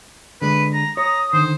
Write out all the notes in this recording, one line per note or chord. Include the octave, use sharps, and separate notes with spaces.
D3 G#3 B4
A#5
C#5 A#5 D#6
D3 D#3 C5